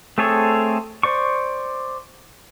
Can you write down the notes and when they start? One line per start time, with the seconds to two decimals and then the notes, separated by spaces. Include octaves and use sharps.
0.18 A3 C4 G#4 A4 C#5
1.03 C5 D5 C#6